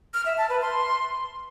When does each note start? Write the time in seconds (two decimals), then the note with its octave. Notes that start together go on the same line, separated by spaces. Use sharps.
0.14 F6
0.26 E5
0.38 A5
0.50 B4
0.62 C6